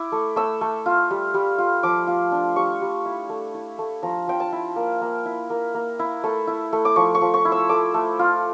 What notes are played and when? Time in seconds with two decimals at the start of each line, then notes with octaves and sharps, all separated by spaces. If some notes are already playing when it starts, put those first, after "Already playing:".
Already playing: E4 D6
0.12 A3
0.36 A3 E6
0.61 A3
0.86 F4
1.10 G3
1.34 G3
1.58 F4
1.83 F3 D6
2.07 F4
2.32 D4
2.56 G3 C#6
2.81 G3
3.06 E4
3.29 A3
3.54 E4
3.79 A3
4.03 F3 A#5
4.28 F3 G5
4.40 A5
4.52 E4
4.76 A#3
5.01 A#3
5.26 E4
5.50 A#3
5.75 A#3
5.99 E4
6.24 A3 A5
6.47 E4
6.73 A3
6.85 D6
6.96 F3 C#6
7.15 C#6
7.22 F3
7.34 C#6
7.45 E4
7.52 E6
7.69 A3 D6
7.94 A3
8.19 F4